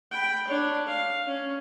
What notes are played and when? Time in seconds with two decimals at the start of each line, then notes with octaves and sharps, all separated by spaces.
0.11 G5 B5
0.47 D4 C#5
0.86 F5
1.27 C#4